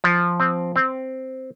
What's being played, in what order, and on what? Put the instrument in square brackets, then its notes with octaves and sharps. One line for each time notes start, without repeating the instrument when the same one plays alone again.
[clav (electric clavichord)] F3
C4
C4